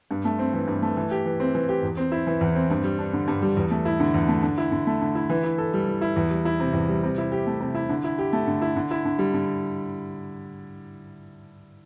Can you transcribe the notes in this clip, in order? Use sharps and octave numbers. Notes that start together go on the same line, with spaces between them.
G2
A3
C4
E3
G2
A3
E3
G4
E3
C4
E3
G4
E2
C4
E4
E3
E2
C4
G2
G3
D4
D3
G2
G3
E2
A3
E4
D3
E2
A3
D3
E4
D3
A3
D3
E4
E3
E4
A4
G3
E3
E4
E2
G3
E4
C3
E2
G3
C3
E4
G4
A3
C3
E4
D3
E4
G4
A3
D3
E4
D3
E4
D3
G3
D3